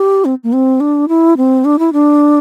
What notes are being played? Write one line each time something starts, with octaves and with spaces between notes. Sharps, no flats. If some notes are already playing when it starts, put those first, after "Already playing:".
Already playing: G4
C4
A#3
C4
D4
E4
C4
D4
E4
D4